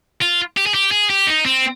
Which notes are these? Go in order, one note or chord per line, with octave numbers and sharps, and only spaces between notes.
F4
G4
G#4
G4
G#4
G4
D#4
C4